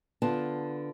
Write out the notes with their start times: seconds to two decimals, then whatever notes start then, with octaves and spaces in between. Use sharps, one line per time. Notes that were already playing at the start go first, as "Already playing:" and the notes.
0.22 D3 B3 F4 A5